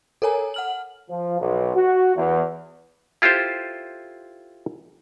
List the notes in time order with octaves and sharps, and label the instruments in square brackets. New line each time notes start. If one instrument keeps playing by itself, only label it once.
[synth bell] A4 A#4 C#5 G#5 A#5
F#5 F6 F#7
[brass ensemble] F3
B1
F#4
E2
[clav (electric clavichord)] E4 F4 G4 A4 C5